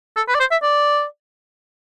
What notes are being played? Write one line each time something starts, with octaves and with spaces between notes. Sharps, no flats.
A4
B4
D5
C5
E5
D5